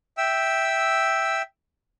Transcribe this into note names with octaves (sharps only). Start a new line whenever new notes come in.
E5 G5 E6